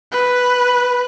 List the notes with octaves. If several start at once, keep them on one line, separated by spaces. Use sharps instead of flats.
B4